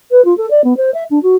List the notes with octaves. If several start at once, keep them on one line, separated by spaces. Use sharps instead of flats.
B4
F4
A4
D5
B3
C5
E5
D4
F#4